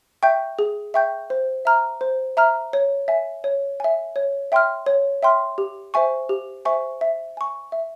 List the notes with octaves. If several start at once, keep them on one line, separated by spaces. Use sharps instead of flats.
E5 G5 C#6 G6
G#4
E5 G5 C#6 G6
C5
E5 A#5 F6
C5
E5 A#5 F6
C#5
E5 G#5
C#5
E5 G#5
C#5
E5 G5 C6 F6
C#5
E5 G5 C6 F6
G4
C5 E5 G#5 C#6
G4
C5 E5 G#5 C#6
E5
G#5 C#6
E5